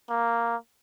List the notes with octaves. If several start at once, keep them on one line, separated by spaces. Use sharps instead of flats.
A#3